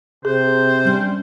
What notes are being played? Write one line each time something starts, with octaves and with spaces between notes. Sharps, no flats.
C3 G#4 C5
G3 C#4 D4